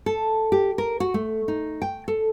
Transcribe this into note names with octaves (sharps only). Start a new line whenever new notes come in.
A4
G4
A#4
F#4
A3
D#4
G5
A4